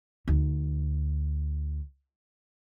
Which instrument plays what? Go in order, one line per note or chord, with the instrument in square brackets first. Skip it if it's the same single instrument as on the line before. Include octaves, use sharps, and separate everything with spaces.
[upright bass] D2 D#4